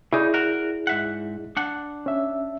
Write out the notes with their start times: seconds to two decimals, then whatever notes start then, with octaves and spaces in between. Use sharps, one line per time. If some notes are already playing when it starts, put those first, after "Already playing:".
0.13 C#3 D#4 E4 G#4 D5
0.34 F#4 A#4
0.87 G#2 E5 F#5
1.57 D4 F#5
2.06 C#4 E5